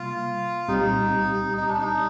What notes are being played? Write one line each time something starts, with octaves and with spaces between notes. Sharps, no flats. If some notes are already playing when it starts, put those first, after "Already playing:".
Already playing: C3 G3 A#3 F4
C2 A#2 G3 C4 D#4 G4
D#4
D4
D#4